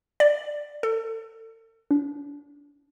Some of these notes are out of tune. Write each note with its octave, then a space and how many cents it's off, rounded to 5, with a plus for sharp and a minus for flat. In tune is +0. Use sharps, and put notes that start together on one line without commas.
D5 +10
A4 +35
D4 -35